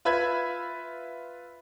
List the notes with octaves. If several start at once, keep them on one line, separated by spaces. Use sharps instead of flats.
F4 B4 E5 B5 G#6